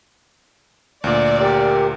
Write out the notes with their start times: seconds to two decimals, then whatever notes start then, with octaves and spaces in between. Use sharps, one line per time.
1.04 D2 A#2 D5
1.39 G4 A#4